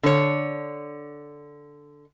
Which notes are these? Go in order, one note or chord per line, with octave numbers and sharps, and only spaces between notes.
D3 C#5